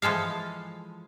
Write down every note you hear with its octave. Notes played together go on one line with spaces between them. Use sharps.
E3 F3 G#3 A4 F5